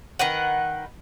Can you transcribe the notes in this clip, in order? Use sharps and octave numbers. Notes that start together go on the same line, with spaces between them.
D#3 B4 F#5